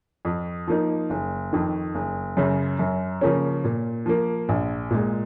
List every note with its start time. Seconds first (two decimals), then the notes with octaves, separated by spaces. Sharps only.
0.25 F2
0.68 F3 A#3 D#4
1.10 F#1
1.53 F2 D#3
1.95 F#1
2.37 F#2 C#3
2.79 F#2
3.21 C#3 F3 A#3 C#4
3.64 A#2
4.06 F3 A#3
4.49 A#1
4.91 A#2 G#3